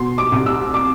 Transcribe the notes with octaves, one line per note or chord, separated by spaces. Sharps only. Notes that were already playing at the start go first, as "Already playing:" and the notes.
Already playing: B2 C6
D6
C2
E6
D6